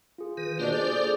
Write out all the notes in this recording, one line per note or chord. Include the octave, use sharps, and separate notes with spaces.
F4 G#4
D#3 B4
B2 A#3 D4 F4 C5 G6
G#4 A4 D5 G6
G#4